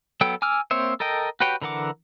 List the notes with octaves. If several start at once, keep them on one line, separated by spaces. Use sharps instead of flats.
F#3 B3 A4 G5
G#5 D6 E6 F6
A#3 C4 C5 C#5 E5
A4 A#4 D#5 G5
F#4 G4 B4 C#5 G5
D3 E3 A#4 F#5 D6